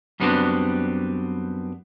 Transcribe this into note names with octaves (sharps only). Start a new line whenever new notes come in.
F#2 G3 B3 C4 D4 F#4